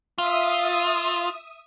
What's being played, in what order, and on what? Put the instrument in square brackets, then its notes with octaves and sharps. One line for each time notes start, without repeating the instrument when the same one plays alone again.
[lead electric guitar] F4 [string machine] E5 D#6